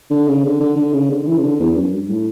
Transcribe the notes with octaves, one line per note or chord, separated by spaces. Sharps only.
D3
C#3
D3
D3
D3
C#3
D3
D3
E3
C#3
D3
E2
F#2
G2
A2